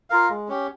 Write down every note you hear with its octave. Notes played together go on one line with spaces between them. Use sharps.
F4 A#4 F5
G#3
C#4 G4